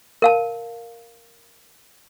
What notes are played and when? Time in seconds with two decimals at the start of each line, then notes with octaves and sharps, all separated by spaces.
0.22 A#4 F5 A5